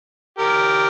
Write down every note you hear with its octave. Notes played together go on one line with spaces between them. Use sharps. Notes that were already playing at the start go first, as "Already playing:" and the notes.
G4 A#4